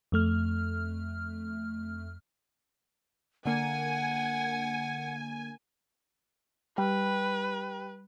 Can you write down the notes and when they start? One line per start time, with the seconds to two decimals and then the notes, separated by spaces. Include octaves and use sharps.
0.12 F2 A3 F6
3.45 D3 A#3 F#5 G#5
6.78 G3 B4